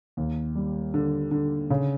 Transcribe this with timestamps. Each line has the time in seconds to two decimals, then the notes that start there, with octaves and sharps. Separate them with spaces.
0.17 D#2
0.55 G3
0.94 D3
1.31 D3
1.70 C#3